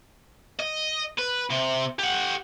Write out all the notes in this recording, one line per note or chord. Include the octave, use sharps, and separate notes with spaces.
D#5
B4
C3
G4 F#5